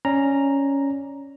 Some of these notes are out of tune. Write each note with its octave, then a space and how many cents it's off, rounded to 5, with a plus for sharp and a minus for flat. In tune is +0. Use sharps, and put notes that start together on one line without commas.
C#4 +0 D5 +0 A#5 +0